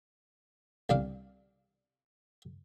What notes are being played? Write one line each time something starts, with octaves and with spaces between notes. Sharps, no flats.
C2 D4 F5